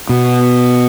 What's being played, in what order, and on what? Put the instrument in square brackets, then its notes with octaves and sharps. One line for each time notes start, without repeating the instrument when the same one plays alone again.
[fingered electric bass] B2